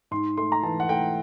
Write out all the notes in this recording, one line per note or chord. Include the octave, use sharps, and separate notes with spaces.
G#2 C6
A3 C6
A#5
E3 A5
F#5
A3 G5